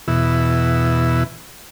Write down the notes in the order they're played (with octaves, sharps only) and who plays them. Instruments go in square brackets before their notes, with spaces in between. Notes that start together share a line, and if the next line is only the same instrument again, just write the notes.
[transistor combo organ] E2 B2 E4